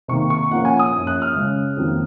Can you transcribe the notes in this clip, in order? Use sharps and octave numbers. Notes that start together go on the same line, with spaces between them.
C3 D#3 A#3 C#6
C#6
A#2 F3 A#3 C#4 F#5
G#5
D#6
F#2 F3 A#3 C#4
F#6
F6
C#3 G#3 C#4
F2 D#3 F#3 A#3